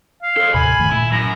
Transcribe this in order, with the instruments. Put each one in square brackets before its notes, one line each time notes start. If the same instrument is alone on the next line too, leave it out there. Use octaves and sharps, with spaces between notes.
[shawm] F5
[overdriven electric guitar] A4 C5
[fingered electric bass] D#2 A2 C3 [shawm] G#5 [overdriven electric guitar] B5
[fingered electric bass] G2 D#3 A3
[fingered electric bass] A#2 [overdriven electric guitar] E4
[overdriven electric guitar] F#2 [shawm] A#5